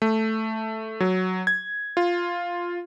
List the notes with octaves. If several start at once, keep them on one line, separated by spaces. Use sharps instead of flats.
A3
F#3
G#6
F4